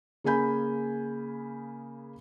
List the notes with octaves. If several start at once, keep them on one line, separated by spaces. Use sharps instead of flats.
C#3 A#3 G#4 G#5 B5 G6